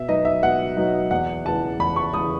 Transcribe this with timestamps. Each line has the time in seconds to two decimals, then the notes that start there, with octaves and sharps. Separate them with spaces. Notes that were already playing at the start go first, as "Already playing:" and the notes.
Already playing: B2 E5
0.08 F#3 B3 D#4 D#5
0.25 E5
0.43 B2 F#5
0.77 F#3 B3 D#4
1.11 E2 F#5
1.46 C#3 E3 A5
1.79 E2 B5
1.96 C#6
2.13 C#3 E3 D#6